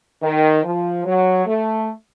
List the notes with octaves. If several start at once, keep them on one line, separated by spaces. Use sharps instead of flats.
D#3
F3
F#3
A3